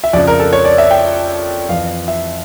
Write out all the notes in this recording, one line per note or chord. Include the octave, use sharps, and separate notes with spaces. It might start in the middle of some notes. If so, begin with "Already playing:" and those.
E5
F2 C#3 F3 D5
A#4
A4
C#5
D5
E5
G5
F2 E3 F5
E5